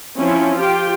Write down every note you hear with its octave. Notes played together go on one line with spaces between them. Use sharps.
F3 C4 C#4 E4
F4 G4 G5